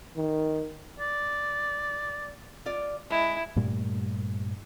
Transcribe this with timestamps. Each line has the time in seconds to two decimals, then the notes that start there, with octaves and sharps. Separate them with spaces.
0.16 D#3
1.00 D5
2.66 F4 D5
3.10 G#3 E4
3.56 G2 A#2 G3 A3